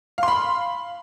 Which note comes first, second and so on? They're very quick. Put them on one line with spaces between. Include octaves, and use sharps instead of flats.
F5 C6 B5